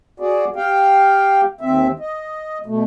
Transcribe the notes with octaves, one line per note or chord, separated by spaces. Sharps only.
F#4 G#4 D5
G4 F5 G5
D#2 C4 E5
D#5
B2 A3